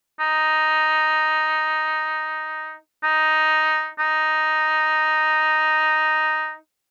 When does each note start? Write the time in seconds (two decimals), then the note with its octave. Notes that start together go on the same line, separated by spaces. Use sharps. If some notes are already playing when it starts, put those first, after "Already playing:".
0.20 D#4
3.03 D#4
3.99 D#4